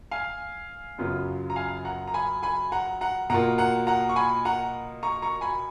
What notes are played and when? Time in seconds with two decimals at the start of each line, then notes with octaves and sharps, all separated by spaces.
0.11 F5 G#5
0.98 F#2 C#3 F#3 B3 F4
1.50 A#5
1.56 F5 G#5
1.85 F#5 A#5
2.07 A#5
2.14 G#5 B5
2.43 G#5 B5
2.72 F#5 A#5
3.01 F#5 A#5
3.30 B2 A#3 F4 F#5 A#5
3.58 F#5 A#5
3.87 F#5 A#5
4.09 C#6
4.16 G#5 B5
4.45 F#5 A#5
5.03 A#5 C#6
5.22 A#5 C#6
5.41 G#5 B5